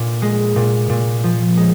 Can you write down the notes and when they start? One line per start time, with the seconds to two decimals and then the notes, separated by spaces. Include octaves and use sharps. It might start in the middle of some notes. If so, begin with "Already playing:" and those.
Already playing: A#2
0.22 G#3
0.56 A#2
0.89 A#2
1.24 F3
1.57 G#3